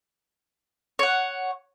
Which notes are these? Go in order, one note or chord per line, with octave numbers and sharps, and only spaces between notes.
C#5 F#5